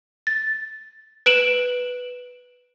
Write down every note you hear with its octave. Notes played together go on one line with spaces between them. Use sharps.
A6
B4 D7 E7 F#7